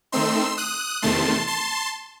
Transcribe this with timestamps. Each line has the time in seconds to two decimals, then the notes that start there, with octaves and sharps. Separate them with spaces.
0.12 D#3 A3 C4 D#4 C6 E6
0.58 D#6 F#6
1.02 E2 C3 D#3 A3 A5 C6
1.47 A5 C6